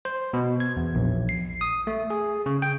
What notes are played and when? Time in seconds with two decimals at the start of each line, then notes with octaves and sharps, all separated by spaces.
0.05 C5
0.33 B2
0.60 G#6
0.77 E2
0.95 A#1
1.29 C7
1.61 D#6
1.87 A3
2.10 G#4
2.46 C#3
2.62 G5